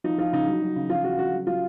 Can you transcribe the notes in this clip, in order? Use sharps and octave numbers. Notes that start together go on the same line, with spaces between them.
F3 D#4
F3 F4
C#3 D#4
F#3
F#3
C#3
F3 F4
F3 F#4
C#3 F#4
F#3
F#3 F4